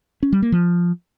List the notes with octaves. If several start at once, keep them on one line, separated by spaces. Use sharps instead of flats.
C#4
G3
A#3
F3